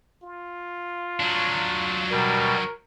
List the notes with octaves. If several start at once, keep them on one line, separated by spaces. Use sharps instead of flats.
F4
F#3 D4
B2 G3 A#4